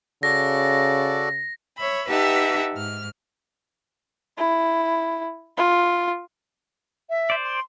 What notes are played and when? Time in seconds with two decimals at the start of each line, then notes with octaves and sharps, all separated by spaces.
0.23 C#3 F#4 A4 D5 A#6
1.78 C#5 E5 B5
2.08 D#4 G4 B4 E5 F#5 A5
2.74 G#2 F6
4.37 E4
5.57 F4
7.10 E5
7.30 C5 D5
7.44 C6